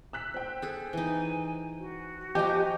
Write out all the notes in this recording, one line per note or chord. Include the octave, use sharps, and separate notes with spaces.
E6 F#6 B6
C5 G5
G#4 A4
E3 D#4 G#5
F#4
F3 G4 D#5 G#5 A#5 G6